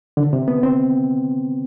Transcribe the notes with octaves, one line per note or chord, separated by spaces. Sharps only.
D3
C3
B3
C4